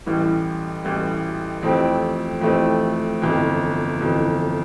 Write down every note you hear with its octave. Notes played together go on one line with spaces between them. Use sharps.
A1 A2 E3 G3
A1 A2 E3 G3
F2 E3 A3 C4 G4
F2 E3 A3 C4 G4
G1 F2 E3
G1 F2 E3